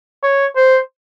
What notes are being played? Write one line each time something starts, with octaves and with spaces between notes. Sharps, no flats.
C#5
C5